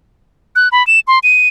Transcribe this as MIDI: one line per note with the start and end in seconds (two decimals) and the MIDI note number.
0.56 0.69 90
0.72 0.85 83
0.87 1.00 100
1.07 1.19 84
1.23 1.48 99